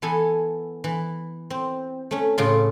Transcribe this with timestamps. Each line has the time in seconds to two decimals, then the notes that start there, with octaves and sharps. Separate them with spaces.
0.02 E3 B3 A4 G#5
0.84 E3
1.50 C4
2.11 A3 C#4
2.38 A2 C#3 F4